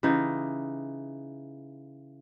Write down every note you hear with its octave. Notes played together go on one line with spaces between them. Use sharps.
C#3 E3 D#4 G4